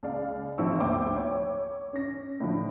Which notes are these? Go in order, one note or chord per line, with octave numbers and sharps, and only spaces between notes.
C#2 D5 F5
G#1 F3 C4 D#4 C#6 E6
G1 D2 C5 G5 D6
C#5
C#4 A#6
A2 D3 F3